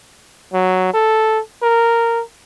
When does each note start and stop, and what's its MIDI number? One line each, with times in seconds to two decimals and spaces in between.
0.53 0.91 54
0.94 1.39 69
1.63 2.21 70